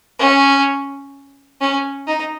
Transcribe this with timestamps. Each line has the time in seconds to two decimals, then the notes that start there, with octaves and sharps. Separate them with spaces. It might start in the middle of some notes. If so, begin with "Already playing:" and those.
0.19 C#4
1.61 C#4
2.07 D#4